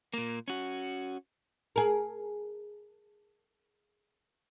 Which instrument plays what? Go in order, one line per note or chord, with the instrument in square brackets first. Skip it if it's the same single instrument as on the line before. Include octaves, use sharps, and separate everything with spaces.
[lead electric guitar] A#2 A#3
C#4 F#4
[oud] G#4 A#4